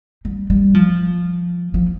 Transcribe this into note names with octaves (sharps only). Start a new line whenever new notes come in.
G3
G3
F3
F3